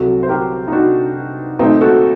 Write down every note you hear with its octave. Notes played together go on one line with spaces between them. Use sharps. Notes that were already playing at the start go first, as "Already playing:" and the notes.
Already playing: C2 C3 F#3 F#4 A4
C5
G4 A#4
D#4
D4 F#4
A#2 A3 C4 D#4
F#4 A4